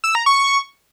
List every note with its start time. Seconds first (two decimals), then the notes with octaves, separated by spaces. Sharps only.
0.04 E6
0.15 A#5
0.26 C#6